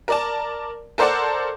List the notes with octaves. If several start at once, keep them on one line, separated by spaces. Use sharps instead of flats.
A#4 D5 A5
A4 A#4 C5 D5 F#5 A5